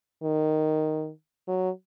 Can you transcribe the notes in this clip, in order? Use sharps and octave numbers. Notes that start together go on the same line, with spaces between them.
D#3
F#3